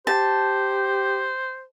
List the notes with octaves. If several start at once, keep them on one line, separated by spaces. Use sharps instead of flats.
G4 C5 A5